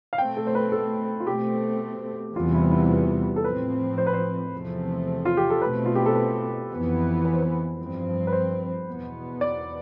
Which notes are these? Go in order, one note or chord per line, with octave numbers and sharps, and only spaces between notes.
F5
B2 A3 C4 G5
A4
C5
B4
A4
F4
B2 A3 C4 G4
E2 C3 E3 G3 B3 F4
E4
E4
F4
A4
A2 F3 C4 B4
C5
B4
C5
E2 C3 F3 A3 C4
F4
G4
A4
B2 A3 C4 B4
F4
G4
A4
B4
F2 E3 B3
B4
C5
B4
G2 F3 C4
B4
C5
E2 B2 B3
D5